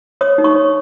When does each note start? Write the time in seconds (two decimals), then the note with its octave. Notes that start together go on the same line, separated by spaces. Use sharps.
0.21 C#5 D#6
0.38 D#4
0.44 C#6
0.55 C#5